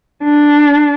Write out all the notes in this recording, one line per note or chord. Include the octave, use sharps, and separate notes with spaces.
D4